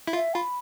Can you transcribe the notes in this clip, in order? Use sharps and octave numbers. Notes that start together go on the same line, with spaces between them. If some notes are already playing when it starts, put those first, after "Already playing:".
E4
F4 E5
F4 B5